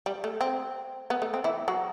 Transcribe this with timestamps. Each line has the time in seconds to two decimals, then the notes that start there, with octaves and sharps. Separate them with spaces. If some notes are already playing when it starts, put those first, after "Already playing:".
0.06 G3
0.24 A3
0.41 C4
1.10 B3
1.22 A3
1.34 C4
1.44 E3 E4
1.68 F#3 F#4